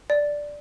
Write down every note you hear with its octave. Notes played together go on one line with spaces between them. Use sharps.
D5